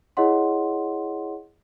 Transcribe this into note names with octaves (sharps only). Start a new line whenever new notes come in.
E4 G#4 C#5 D#5 F#5 C6